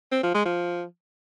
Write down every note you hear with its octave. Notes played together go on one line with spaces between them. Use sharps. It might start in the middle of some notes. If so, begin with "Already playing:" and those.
C4
F3
G#3
F3